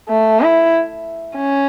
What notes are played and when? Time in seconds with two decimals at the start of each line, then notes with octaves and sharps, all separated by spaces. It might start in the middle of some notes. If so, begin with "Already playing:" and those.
0.09 A3
0.41 E4
1.36 C#4